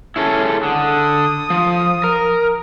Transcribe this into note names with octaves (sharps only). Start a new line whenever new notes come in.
C#4 E4 G#4 A4
D3 D#6
F3
A#4